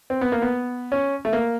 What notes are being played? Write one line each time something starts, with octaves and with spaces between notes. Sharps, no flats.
C4
B3
A#3
B3
C#4
A3
A#3